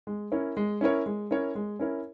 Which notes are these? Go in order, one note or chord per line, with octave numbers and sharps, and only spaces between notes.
G#3
C#4 E4 A#4 C#5
G#3
C#4 E4 A#4 C#5
G#3
C#4 E4 A#4 C#5
G#3
C#4 E4 A#4 C#5